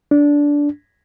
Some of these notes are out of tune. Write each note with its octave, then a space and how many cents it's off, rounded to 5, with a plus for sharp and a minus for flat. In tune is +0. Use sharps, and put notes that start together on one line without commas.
D4 -15